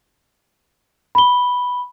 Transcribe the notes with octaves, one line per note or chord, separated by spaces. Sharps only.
B5 G7